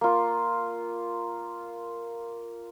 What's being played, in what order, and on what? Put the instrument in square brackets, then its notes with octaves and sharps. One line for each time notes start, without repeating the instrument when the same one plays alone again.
[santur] A#3 F4